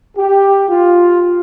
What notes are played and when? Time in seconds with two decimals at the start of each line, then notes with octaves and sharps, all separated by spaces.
0.17 G4
0.68 F4